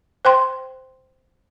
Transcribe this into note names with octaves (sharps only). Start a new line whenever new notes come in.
C5 G5 C6